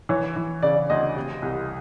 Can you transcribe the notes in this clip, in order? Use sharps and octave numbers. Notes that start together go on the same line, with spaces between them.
E3 C#5
E3
C#3 D5
D2 D#5
C3
C2